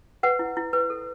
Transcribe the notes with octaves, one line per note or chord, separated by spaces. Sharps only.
B4 F#5
E4
E4
B4
A4